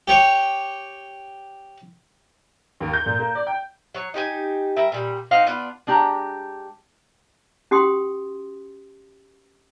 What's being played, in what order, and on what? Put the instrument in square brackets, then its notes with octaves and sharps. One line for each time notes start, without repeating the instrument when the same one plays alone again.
[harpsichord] G4 C#5 C#6
[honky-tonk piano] D#2
G6
A#2
A#3
D5
G5
[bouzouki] F#3 C#5
D#4 G4 A#4 G#5
G3 A#4 E5
A#2 G3
C4 D#4 F5 F#5
B3 D4 F4
[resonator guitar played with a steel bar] G#3 D4 G4 A#5
[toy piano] C#4 F#4 G4 G5 C6 D#6